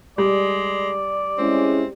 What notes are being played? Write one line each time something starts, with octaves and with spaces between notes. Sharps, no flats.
G3 G#3 D5
G#3 C4 C#4 E4